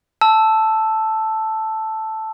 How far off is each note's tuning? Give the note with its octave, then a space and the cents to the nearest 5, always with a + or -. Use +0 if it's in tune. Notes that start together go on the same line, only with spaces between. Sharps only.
A5 +0 E6 +0